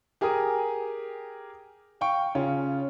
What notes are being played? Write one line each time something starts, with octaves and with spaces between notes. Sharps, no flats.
G4 G#4 A#4 G#5 D#6
F5 G5 C#6
C#3 C#4 F4